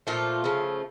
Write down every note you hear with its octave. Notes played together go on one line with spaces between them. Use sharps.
A#2 F3 A3 F4
C#3 F3 A3